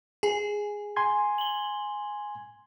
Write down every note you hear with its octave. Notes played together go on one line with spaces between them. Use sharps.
G#4 G#5
G#5 C6 G#6
F#7 G7